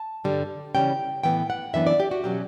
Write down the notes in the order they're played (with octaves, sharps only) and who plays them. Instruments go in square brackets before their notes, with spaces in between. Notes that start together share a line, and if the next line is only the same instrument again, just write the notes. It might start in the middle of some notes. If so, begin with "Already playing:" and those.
Already playing: [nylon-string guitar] A5
G2 D3 G3
C#3 E3 G3 C#4 G5
A2 E3 B3 G5
F#5
F#2 E3 B3 D4 E5
D5
G4
F#4
B2 F#3 C#4 G4